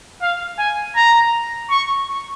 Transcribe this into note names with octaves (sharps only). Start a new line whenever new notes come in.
F5
G#5
A#5
C#6